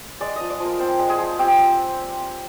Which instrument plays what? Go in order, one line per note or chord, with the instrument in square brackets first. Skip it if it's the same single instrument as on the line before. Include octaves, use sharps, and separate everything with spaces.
[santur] G#3 D5
F3 D#5
D5
F3
A#4
C4 C5
G#3
G#4
F3
C4 G4